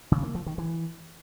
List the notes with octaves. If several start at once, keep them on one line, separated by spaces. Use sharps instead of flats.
C#3
A#3
F3
D#3
E3